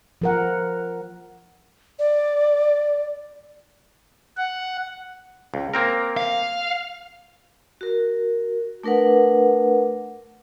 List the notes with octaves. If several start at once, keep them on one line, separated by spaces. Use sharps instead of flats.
F3 A#4 F#5
D5
F#5
C#2
A#3 C4 A#4
F5
F#4 A#4
A3 D4 A#4 B4 F#5